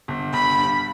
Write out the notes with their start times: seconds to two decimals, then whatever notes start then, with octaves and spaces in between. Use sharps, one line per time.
0.08 G1
0.33 G1 B5
0.58 G2